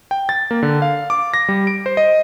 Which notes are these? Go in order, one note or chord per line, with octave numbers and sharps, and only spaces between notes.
G5
A6
A#3
D3
F5
D6
A#6
G3
D7
C5
D#5